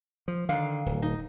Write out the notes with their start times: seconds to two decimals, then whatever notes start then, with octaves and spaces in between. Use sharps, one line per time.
0.28 F3
0.49 D3 D#3 F3 F5
0.86 D1
1.02 D#4